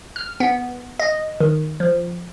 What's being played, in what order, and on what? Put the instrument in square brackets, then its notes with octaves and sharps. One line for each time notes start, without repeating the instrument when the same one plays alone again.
[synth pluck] F6
B3
D#5
D#3
F3